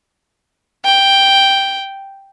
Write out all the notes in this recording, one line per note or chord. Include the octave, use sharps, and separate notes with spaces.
G5